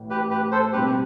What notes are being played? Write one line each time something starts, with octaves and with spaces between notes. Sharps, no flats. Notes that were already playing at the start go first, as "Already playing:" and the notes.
Already playing: A1 A2
G4 B4
G4 B4
A4 C5
B2 G3 C4 G4 B4